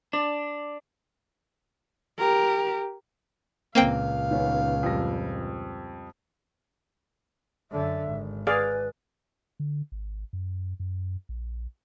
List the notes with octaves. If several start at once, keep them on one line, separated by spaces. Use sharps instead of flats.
D4 D5
G4 A#4
C#2 A#2 A#3 C4 F5 G5
D#3 B3 C#4
F2 G3 A#6
F#2 D3 E5
G#1
G#4 B4 D5 F5
D3
G#1
F#2
F#2
A#1